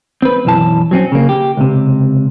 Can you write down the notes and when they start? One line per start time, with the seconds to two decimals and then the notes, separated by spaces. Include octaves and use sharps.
0.22 C4 B4
0.45 B1 F#2 E3 A5
0.91 F#3 C4 C#4
1.12 C#3 A#3
1.29 G4
1.57 C#2 C3